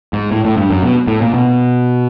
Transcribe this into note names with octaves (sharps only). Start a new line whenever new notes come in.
G#2
A2
A2
G2
F#2
B2
A2
A#2
B2